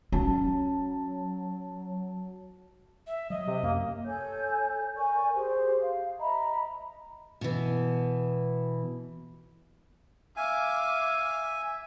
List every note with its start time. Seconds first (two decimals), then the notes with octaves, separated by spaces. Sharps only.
0.12 F#3 C#4 F#4 A5
3.07 E5
3.30 F#3 D#5
3.47 C3
3.63 F#2 A#3
4.06 A4 C#5 G#5 G6
4.97 A#4 D5 G#5 C#6
5.35 G4 G#4 C5
5.82 F5
6.19 D#5 E5 A#5 B5
7.41 B2 E3
10.37 E5 F5 G#5 D6